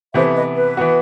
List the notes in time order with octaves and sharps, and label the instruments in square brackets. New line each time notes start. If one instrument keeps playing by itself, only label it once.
[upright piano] C3 E3 B3 E4 A4 [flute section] C5 E5
[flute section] B4 D#5
B4
[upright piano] E3 B3 F#4